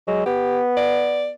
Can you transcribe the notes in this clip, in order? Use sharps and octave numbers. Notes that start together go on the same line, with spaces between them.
F#3 G#3
B3 G4
D5